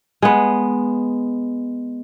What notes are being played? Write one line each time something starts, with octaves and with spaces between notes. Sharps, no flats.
G#3 B3